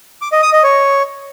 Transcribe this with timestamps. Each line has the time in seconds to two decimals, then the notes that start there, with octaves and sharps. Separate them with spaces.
0.22 D6
0.32 D#5
0.43 D#6
0.53 D#5
0.63 C#5